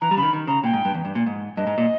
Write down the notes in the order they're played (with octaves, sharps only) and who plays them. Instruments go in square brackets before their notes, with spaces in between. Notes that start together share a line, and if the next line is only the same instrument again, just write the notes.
[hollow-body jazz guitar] E3 [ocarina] A#5
[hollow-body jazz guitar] G3
[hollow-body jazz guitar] C#3 [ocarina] B5
[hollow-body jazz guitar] D#3
D#3
[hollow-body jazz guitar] C#3 [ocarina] A#5
[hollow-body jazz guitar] A#2 [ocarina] G5
[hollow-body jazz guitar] G#2
G2
E2
G2
A#2
G#2
[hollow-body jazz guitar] G2 [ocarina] D#5
[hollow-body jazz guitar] G#2
A#2